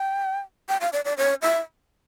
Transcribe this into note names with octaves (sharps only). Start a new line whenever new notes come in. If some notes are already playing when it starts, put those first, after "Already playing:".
Already playing: G5
G5
F5
D5
D5
C#5
E5